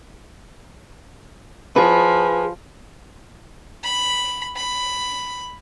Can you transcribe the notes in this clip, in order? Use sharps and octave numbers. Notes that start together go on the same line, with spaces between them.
F3 G#4 B4
B5
B5